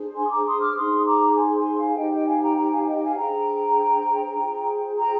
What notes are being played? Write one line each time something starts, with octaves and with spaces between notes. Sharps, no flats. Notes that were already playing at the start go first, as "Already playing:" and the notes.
Already playing: D4 G#4 C5
G#5 C6
D#6
A#5 D6
C6 D#6
D6 F6
D#4 G#4 C5 C6 D#6
D#6
A#5 D6
D6
G#5 C6
G#5 C6
F5 G#5
D#4 G4 C5 D#5 G5
D#5 G5
F5 G#5
G5 A#5
G5 A#5
F5 G#5
G#5
D#5 G5
G5
F5 G#5
D4 G#4 C5 G5 A#5
F4 G#4 C5
G5 A#5